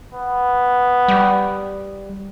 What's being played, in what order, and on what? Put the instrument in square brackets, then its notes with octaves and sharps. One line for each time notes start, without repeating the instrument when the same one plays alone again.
[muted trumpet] B3
[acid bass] G3